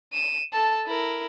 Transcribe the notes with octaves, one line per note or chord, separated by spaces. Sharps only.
D#7 E7
A4 A5
E4 A#4